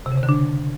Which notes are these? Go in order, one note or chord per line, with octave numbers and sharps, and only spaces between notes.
C3
C#3
C3
D3
D4